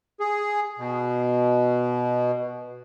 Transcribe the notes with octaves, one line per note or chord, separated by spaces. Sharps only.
G#4
B2